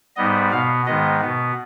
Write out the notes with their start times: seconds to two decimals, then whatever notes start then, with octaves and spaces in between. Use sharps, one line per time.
0.16 G#2 G3 B3 D#5
0.51 B2 B3 F5
0.86 G#2 D#3 G#3 B3 D#5
1.21 B2 B3